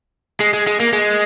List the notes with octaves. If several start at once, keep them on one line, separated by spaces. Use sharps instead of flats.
G#3
G#3
G#3
A#3
G#3